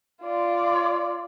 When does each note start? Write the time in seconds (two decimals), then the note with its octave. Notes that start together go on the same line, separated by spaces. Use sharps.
0.22 F4 D5